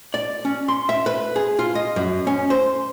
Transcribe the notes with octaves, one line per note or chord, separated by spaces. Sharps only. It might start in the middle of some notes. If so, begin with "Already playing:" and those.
D5
C#4
C6
E5
B4
G#4
F4
D#5
F#2
C#4
C5